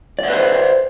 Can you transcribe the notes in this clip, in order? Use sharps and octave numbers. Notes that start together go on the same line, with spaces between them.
B4 C5 D5 E5